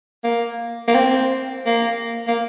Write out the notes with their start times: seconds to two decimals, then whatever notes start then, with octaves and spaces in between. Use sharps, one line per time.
0.24 A#3
0.88 A#3
0.95 C4
1.66 A#3
2.27 A#3